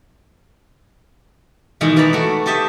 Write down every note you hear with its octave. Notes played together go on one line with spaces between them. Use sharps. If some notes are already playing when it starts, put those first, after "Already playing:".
B2 D#3 E3 G#3
B2 E3 D5 A#5 B5
A3 F#4
G4 A4 D#5 E5